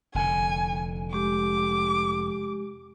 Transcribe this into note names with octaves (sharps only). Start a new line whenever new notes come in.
F1 D3 G#5
G#3 G4 D6